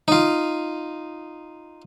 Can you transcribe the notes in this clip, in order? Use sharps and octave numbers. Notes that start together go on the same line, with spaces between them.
D#4 F4